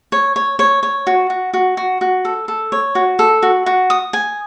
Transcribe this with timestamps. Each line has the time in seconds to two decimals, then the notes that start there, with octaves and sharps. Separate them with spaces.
0.12 C#5
0.36 C#5
0.59 C#5
0.83 C#5
1.07 F#4
1.30 F#4
1.53 F#4
1.77 F#4
2.01 F#4
2.25 A4
2.48 A4
2.72 C#5
2.95 F#4
3.19 A4
3.43 F#4
3.66 F#4
3.90 D#6
4.13 G#5